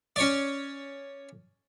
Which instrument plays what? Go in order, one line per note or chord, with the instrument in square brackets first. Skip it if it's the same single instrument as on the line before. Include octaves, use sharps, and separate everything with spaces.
[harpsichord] C#4 C#5 D5